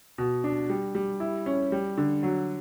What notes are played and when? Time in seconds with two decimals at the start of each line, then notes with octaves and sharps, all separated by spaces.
0.18 B2
0.44 D4
0.69 G3
0.95 G3
1.20 E4
1.46 C#4
1.72 G3
1.97 D3
2.23 F#3